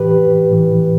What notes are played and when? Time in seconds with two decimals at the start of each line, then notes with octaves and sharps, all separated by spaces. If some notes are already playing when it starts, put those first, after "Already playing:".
Already playing: A2 E3 G4 B4
0.50 A2 E3